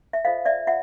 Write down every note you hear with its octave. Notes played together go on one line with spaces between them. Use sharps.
E5
F4 A4 C5 D#5 F5
D5 E5
F4 E5 F#5